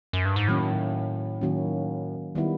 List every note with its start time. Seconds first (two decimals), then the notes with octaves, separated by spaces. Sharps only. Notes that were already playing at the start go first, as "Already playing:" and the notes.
0.13 F#2
0.25 G2
0.36 G#2
0.48 A2 D#3 F#3 A#3 C#4
1.41 D#3 F#3 A#3 C#4
2.35 D#3 G3 B3 E4